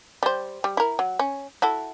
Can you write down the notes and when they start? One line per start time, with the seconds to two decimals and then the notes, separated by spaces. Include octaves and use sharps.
0.23 G3 C5
0.64 G3
0.77 E4 A#4
0.99 F#3
1.19 C#4
1.62 E4 F#4 A4